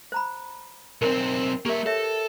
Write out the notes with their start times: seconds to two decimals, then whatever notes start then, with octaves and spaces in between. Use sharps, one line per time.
0.12 C5 A#5 B5
1.02 B1 C4 A#4
1.65 A#3 G4 A#4 E5
1.86 A4 C#5 E5